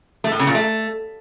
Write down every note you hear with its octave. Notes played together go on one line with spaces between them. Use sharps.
A3
A2
C#3
A#2
A3